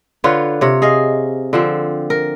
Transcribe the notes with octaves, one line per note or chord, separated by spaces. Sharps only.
D3 F4 B4 C#5
C3 C#5
G#4 D#5 F5
D3 F3 C4
A#4